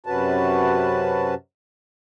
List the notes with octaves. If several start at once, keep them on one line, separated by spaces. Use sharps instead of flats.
F#2 C3 C#4 F#4 B4 A5